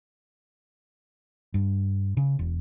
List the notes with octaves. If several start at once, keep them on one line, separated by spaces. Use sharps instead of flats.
G2
C#3
E1